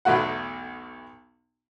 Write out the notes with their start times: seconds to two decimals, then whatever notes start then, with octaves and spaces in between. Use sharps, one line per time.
0.05 B1 E2 A3 F#4 F#5